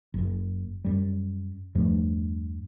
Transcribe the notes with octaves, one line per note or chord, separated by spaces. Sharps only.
F#1 F#2
F#2 G3
E2 G2 F3 A3